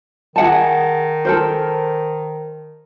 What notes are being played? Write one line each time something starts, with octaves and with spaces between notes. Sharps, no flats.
D#3 G#4 F#5 A5
A4 A#4 C5